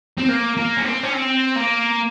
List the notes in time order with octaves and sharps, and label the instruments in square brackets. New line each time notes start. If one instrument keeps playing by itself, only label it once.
[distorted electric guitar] C4
A#3
A#3
C#4
C4
C#4
C4
A#3